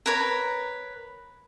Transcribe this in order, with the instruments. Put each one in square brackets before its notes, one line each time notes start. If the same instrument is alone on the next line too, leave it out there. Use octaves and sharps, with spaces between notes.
[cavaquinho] A#4 B4 C#5 A#5